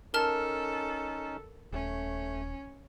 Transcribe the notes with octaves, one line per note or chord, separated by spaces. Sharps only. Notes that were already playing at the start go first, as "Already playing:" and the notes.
C#4 D#4 A4 A#4 A5 F6
D#1 A3 C#4